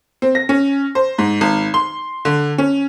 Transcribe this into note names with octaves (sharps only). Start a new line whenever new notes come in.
C4
A#6
C#4
C5
G#2
G#1
C6
D3
C#4